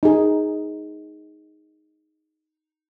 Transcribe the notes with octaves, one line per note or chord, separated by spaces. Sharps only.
D#4 G#4